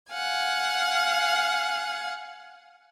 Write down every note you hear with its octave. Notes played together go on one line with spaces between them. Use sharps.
F5 F#5 G#5